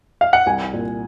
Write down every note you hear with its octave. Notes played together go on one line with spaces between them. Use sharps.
F5
F#5
C2 G#5
A#2